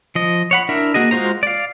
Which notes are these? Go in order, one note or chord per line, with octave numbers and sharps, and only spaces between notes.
F3 D#5
C#5 F#5 B5
D4 E4 A#4 E5
A#3 F#4 G#4 D#5
G#3 F4 F#4 C5 A#5
D5 F5